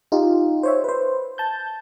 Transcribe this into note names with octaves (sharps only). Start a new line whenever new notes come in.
D#4 F4 G4
C5 C#5 E5
B4 C5
A5 G6